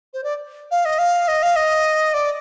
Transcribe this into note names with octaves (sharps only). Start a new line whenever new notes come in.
C5
D5
F5
D#5
F5
D#5
F5
D#5
D5